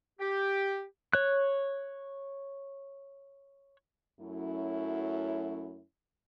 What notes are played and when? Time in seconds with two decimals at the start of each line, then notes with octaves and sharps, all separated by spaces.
0.20 G4
1.13 C#5 F#6
4.20 F#2 F#3 A3 C#4 E4